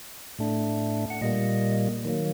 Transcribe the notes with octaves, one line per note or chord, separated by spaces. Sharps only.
A2 A3 D4
F#5
A#2 G3 A#3 D#5
D#3 F#3 A#3